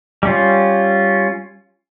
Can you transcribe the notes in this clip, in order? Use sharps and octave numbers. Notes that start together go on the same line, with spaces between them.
G3 C#4 F4